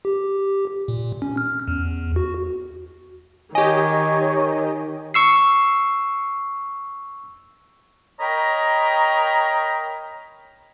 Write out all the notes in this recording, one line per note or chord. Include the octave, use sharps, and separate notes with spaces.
G4
A#2
C#4
F6
E2
F#4
D#3 G4 C#5 D#5 G#5
C#6 E6 C7
A#4 C#5 D#5 G5 A#5 B5